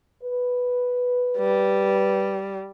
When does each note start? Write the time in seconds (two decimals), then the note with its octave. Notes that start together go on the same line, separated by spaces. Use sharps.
0.22 B4
1.38 G3